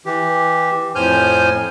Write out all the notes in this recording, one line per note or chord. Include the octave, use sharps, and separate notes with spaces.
E3 G4
F2 A2 C5 G#5 F6 G6